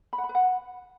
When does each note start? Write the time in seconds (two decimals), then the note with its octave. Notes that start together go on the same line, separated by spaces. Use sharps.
0.13 B5
0.18 F#5
0.24 B5
0.29 B4
0.35 F#5